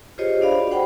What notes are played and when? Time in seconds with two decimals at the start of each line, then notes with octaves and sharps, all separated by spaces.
0.18 F4 G4 G#4 C5 C#5 D#5
0.41 D4 D5 F5 B5
0.60 F#4
0.71 C5 F#5 G5 B5